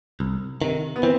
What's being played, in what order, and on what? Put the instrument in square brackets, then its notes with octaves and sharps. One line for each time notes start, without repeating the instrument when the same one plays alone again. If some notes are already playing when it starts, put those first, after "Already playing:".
[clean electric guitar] C2
C3 D#3
[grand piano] B3
[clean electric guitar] E3 [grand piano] C4